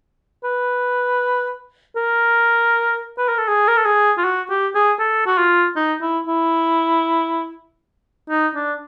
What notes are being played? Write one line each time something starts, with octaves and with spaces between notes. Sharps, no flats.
B4
A#4
B4
A#4
A4
G#4
A#4
A4
G#4
F4
F#4
G4
G#4
A4
F#4
F4
D#4
E4
E4
D#4
D4